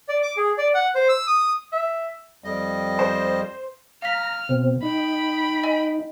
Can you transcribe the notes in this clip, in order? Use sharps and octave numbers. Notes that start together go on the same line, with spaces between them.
D5
D6
G#4
D5
F#5
C5
E6
D#6
E5
F2 G3 D#5
C5
F5 A#5 F6 B6
B2 C4
D#4 G5 B5
D#5 G#5